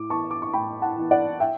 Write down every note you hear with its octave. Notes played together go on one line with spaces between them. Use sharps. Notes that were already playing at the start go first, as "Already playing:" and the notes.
Already playing: A2 D6
E3 B3 A5 C#6
D6
C#6
A2 G5 B5
F#5 A5
E3 B3
D5 F#5
E5 G5